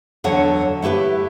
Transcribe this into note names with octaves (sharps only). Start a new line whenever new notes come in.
E2 D3 F#3 C#5 F#5 A5
A3 E4 G4 B4 E5